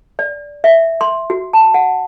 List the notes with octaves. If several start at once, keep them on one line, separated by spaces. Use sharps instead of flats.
D5
E5
C6
F#4
A5
F#5